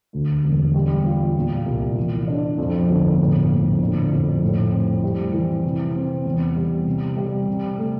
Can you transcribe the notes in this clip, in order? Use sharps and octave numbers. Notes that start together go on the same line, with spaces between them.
D2
E1
G3
F4
A#2
C2
E3
D4
F2
G1
A2
A#1
D3
F2
A2
C4
G3
E3
C3
C4
E2
G3
C3
G3
C3
A3